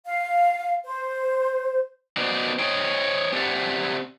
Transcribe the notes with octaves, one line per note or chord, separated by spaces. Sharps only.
F5
C5
B3 D#4 F#4 C5 D5
C5 C#5 D#5 G5
C4 G4 C5 D5 E5 F#5